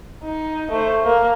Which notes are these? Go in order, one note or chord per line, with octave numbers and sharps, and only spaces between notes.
D#4
A3 C5
A#3